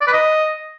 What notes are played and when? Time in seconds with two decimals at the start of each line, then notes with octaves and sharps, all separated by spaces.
0.01 D5
0.07 B4
0.13 D#5